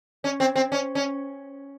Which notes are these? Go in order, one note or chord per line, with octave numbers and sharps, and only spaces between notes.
C#4
C4
C4
C#4
C#4